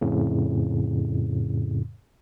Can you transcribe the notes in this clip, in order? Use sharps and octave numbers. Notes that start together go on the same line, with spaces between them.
F2 A2 C#3